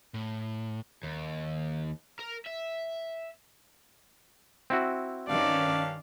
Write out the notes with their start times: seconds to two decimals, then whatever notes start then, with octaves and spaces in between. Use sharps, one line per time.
0.14 A2
1.03 D#2
2.19 A#4
2.46 E5
4.70 C4 E4 F#4
5.28 G2 D#3 C#4 D5 F5